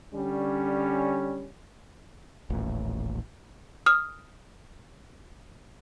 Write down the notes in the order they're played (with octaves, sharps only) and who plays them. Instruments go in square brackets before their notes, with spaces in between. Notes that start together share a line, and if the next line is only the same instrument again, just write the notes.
[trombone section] D3 G3 C#4
[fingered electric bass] D#1 A1
[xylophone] D#6 F6